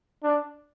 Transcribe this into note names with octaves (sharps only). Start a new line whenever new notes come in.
D4